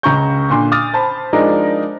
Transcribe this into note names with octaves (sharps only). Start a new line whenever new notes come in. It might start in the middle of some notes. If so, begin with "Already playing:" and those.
C#2 C#3 A#5 C#6 G6
A#2 D3 D4 C6
D6 D#6 F6 A6
C5 A5 B5
F3 G#3 D4 D#4 A#4 D5